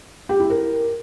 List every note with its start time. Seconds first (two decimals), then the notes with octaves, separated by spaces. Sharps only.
0.29 G4
0.40 E4
0.50 A#4